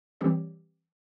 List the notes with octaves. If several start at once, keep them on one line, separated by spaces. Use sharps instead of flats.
E3 G3 C4 G4 C#5